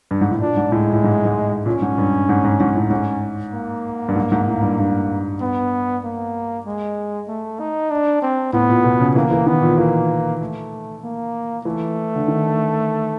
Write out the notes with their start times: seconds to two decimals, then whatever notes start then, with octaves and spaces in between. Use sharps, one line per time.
0.11 G2
0.21 G#2
0.31 A2
0.41 A#2 D4
0.57 G#2
0.72 A2 G#3
0.93 A2
1.04 G#2
1.25 G#2
1.66 A#2 C#4
1.82 G#2
1.98 G2
2.29 G#2
2.44 G#2
2.60 G#2
2.75 A2
2.91 G#2 C#4
3.54 A#3
4.08 G2
4.15 G#2
4.32 G#2
4.48 A2
4.62 G2
4.79 G2
5.41 B3
6.03 A#3
6.66 G#3
7.28 A3
7.59 D#4
7.91 D4
8.22 C4
8.53 A2 B3
8.69 A#2
8.84 B2
9.00 C#3
9.15 E3 A#3
9.31 E3
9.46 D#3 B3
9.62 A#2
9.78 E3 A#3
10.41 A3
11.03 A#3
11.65 E3 A3
12.15 D3
12.28 D#3